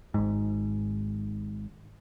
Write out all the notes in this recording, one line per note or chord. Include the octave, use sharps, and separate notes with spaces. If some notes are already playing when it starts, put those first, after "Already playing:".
G#1 G#2